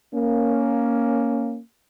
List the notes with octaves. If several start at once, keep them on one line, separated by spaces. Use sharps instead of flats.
A#3 C#4